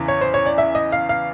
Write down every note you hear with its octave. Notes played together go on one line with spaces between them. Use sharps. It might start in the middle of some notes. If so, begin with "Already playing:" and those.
Already playing: E2 C#3 E3
C#5
C5
C#5
D5
E5
D#5
F5
F5